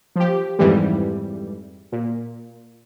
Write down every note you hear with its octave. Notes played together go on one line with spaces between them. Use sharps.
F3 G4
F2 G#2 E3 G3
A#2